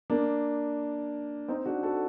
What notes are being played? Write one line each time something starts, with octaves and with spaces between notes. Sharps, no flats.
A#3 D4
C4 D#4
D4 F#4
F#4 A4